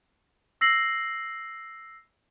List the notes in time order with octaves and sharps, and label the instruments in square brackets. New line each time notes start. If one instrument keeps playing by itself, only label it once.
[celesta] E6 A#6 C7 F#7